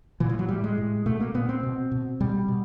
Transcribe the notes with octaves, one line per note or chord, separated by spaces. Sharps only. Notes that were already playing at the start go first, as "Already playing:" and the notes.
A#2 E3
F3
F#3
A2 G3
G#3
A2
B2 A3
A#3
A#2 B3
C4
B2
B2
B2 G3
B2